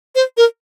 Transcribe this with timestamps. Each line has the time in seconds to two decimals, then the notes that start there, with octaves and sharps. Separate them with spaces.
0.15 C5
0.37 A#4